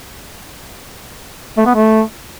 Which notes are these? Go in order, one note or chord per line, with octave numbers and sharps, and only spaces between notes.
A3
B3
A3